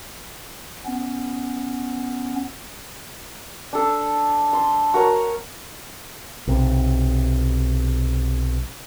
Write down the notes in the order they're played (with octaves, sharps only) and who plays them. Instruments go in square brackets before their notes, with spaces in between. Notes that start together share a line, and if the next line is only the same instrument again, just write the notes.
[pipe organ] B3 C#4
[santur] D4 A4
C6
F#4 A#4 C#5
[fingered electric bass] B1 C3